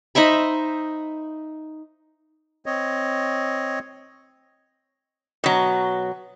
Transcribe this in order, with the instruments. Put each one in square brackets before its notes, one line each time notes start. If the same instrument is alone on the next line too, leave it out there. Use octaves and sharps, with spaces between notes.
[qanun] D#4 C5 E5 B5
[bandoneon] C4 C#5 D#5
[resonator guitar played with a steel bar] B2 F#3